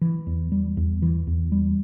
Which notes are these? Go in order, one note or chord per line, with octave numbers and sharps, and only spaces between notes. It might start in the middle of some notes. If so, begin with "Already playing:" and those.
E3
E2
G3
E2
E3
E2
G3